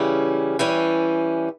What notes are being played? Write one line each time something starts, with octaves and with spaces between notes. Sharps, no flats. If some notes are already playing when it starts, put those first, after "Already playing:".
Already playing: C#3 E3 G3 C#4
E3 G3 C#4